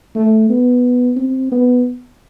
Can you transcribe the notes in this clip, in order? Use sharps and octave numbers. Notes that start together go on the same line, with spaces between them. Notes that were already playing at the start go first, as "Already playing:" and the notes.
A3
B3
C4
B3